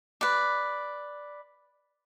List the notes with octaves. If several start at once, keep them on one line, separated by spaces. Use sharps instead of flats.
B4 D5